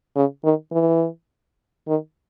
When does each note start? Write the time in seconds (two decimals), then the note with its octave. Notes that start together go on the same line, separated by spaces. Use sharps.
0.16 C#3
0.44 D#3
0.72 E3
1.88 D#3